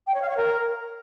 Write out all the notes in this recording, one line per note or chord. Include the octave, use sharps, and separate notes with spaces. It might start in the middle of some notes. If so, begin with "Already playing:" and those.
G5
C#5
F5
C#5
A#4